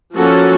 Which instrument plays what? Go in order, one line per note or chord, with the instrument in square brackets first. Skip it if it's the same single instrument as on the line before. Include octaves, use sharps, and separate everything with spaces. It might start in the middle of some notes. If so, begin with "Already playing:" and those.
[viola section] F3 A#3 C#4 F#4 A4